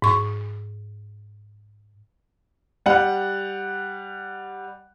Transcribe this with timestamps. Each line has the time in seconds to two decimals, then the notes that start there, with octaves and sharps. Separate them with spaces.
0.02 G#2 C#6
2.86 G3 F#5